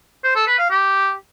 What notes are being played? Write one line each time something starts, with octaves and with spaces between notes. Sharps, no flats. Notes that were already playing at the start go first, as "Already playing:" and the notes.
C5
A4
B4
F5
G4